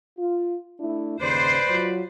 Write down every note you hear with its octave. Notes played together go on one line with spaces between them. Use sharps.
F4
A3 D4 E4
D#2 C#3 B4 C5 D5
F#3 F4